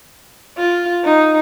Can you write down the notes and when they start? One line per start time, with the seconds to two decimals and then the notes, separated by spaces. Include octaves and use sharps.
0.57 F4
1.04 D#4